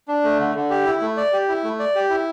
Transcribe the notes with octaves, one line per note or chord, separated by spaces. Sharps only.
D4
A3
D3
D3
G4
E4
A3
D5
G4
E4
A3
D5
G4
E4